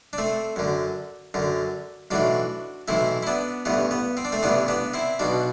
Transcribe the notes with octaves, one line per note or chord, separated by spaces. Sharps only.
D4
A3 C4
F#2 D3
F#2 D3
B1 A2 E3 D4 F#4
B1 A2 E3 C4 E4
E4
B3 D4
A1 G2 E3 B3
B3
C4
D4
A3 C4
A1 G2 E3 B3 D4
B3 D4
C4 E4
B1 B2 D4 F#4